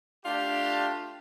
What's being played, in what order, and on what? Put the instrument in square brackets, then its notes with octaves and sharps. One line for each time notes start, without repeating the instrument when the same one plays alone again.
[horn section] A3 D4 F4 G4